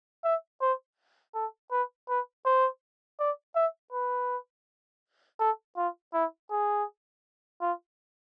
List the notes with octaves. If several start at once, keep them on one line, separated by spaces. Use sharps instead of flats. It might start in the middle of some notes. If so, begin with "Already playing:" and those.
E5
C5
A4
B4
B4
C5
D5
E5
B4
A4
F4
E4
G#4
F4